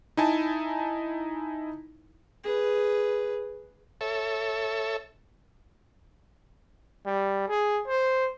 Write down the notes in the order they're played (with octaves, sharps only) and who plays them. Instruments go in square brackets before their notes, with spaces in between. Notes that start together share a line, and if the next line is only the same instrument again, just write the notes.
[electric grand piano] D#4 E4 G#5 A5
[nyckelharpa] G#4 B4
[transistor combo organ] A4 C#5 E5
[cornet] G3
G#4
C5